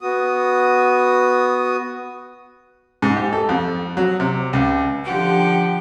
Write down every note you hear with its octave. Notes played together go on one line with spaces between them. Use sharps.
B3 F#4 D#6
G#2
G4
A4
F2
F#3
C3
C#2
D3 F3 G4 F#5 G5